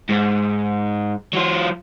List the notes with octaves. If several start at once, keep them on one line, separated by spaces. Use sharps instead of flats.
G#2
F#3 F4